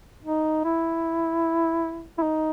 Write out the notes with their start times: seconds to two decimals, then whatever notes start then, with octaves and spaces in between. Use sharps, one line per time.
0.24 D#4
0.64 E4
2.18 E4
2.22 D#4